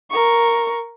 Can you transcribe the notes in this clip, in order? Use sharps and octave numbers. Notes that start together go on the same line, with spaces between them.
A#4 C#6